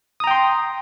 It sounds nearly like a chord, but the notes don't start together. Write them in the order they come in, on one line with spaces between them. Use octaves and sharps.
D#6 A#5 G5 C6